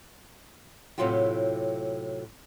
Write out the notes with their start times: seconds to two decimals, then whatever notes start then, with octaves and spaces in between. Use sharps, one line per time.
0.98 A2 C3 D#3 F#3 F4 G4